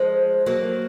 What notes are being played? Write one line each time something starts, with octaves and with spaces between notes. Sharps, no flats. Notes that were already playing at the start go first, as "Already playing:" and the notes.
Already playing: F3 G#3
F#3 A#3